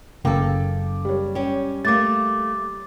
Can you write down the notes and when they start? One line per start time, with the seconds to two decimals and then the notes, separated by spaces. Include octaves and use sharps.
0.25 F#1 F#2 C#3 A#3 A4 G5 D6
1.05 G3 C#5
1.35 C#4 G4
1.85 A3 A#3 D6 A6